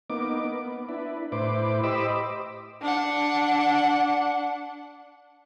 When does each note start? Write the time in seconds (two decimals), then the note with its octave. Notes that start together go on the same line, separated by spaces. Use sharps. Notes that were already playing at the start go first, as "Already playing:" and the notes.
0.10 A#3 B3 D#4 D6
0.44 B3
0.89 D4 E4 B4
1.32 A2 E4 B4 C5 D6
1.84 G4 C5 D#5 B5 D6 E6
2.82 D4 F#5